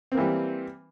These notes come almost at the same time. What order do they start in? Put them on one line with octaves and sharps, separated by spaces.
C4 A#3 E3 G3